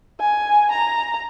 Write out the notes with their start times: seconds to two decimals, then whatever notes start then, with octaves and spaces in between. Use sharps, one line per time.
0.20 G#5
0.71 A#5